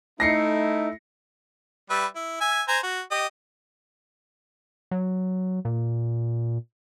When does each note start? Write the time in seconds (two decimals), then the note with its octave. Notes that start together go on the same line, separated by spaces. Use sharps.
0.20 A3 D#4 E4 A#6 C7 C#7
1.90 G3 B4 E5
2.16 E4
2.41 E5 G#5
2.68 C5 G#5 A#5
2.83 F#4
3.11 G4 D#5
4.91 F#3
5.65 A#2